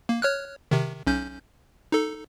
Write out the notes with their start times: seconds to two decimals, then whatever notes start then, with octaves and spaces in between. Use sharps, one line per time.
0.09 A#3
0.22 C#5 F6 F#6
0.71 C3 D#3
1.07 B1 C#4 G6
1.92 D#4 A4